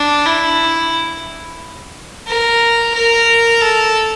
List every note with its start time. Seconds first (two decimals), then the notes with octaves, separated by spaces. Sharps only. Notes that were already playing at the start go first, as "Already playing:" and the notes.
Already playing: D4
0.26 E4
2.27 A#4
2.94 A#4
3.61 A4